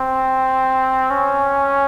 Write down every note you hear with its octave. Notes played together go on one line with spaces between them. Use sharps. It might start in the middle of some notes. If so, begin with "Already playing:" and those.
Already playing: C4
C#4